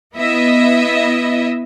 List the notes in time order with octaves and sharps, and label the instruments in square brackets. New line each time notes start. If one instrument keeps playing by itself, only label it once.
[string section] B3 E4 D#5 E5